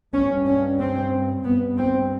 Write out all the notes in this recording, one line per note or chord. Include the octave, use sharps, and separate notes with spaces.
G2 C#4
C#4
C4
G2 B3
C4